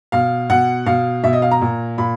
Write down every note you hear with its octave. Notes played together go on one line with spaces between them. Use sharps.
B2 F5
B2 F#5
B2 F5
B2 E5
D#5
F5
A#5
A#2
A#2 B5